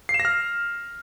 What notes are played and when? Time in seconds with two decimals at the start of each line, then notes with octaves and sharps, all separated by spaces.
0.09 C7
0.14 E7
0.20 A#6
0.25 F6